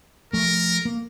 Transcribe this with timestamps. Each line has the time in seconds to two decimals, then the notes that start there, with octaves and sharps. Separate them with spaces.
0.33 F3 A3 A#4
0.85 A#3